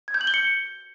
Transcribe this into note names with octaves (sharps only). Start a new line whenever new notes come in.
G#6
G6
F#7
G7
C#7